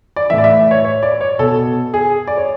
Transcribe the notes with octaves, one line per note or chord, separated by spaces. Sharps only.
D5
A2 E3 E5
D5
E5
C#5
C#5
D5
C#5
B2 A4
G#4
D5
C#5